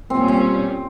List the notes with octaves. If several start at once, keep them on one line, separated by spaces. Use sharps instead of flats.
A#2 G3 C4 C#4
C4